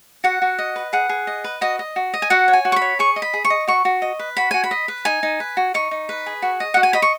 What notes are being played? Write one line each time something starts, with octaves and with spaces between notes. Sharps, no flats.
F#4 F#5
F#4
D#5
B4
G#4 F#5
G#4
D#5
B4
F#4 D#5
D#5
F#4
D#5
G#5
F#4 F#5
C#5
G#5
F#4
C#6
B5
C#5
G#4 C#6
D#5
B5
G#4
C#6
D#5
F#4 C#6
F#4
D#5
B4
F#4 B5
F#4 G#5
B5
D#5
B4
D#4 G#5
D#4
B4
F#4
D#4 C#6
D#4
B4
G#4
F#4
D#5
F#4 F#5
G#5
D#5 B5
C#6